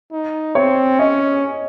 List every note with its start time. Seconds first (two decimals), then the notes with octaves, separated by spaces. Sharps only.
0.12 D#4
0.55 C4 C#5
0.99 C#4 D#5